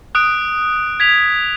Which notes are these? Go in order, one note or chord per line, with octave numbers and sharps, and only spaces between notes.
D#6 F#6 D7
G#6 B6 F7